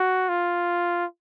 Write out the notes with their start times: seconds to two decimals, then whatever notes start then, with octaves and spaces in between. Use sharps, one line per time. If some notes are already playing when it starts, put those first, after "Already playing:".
Already playing: F#4
0.29 F4